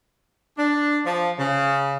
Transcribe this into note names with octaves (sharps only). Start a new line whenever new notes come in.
D4
F3
C#3